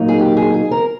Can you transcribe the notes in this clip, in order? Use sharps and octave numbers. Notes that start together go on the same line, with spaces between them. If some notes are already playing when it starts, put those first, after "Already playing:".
Already playing: A#2 F#3 A#3 D#4
G#4
G4
G#4
G#4
A#4